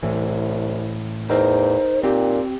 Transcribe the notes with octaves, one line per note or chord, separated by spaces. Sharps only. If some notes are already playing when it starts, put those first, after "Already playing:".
C2 A2 E3
E2 D#4 A#4 C5
A#2 C4 G4